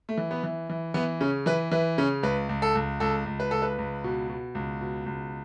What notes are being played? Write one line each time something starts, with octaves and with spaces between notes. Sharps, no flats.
A3
E3
B3
E3
E3
E3 B3
C#3 C#4
E3 B4
E3 B4
C#3 C#4
C#2 B4
C#2
A4
C#2
C#2 A4
C#2
B4
C#2 A4
B4
C#2
B2
B2
C#2
B2
C#2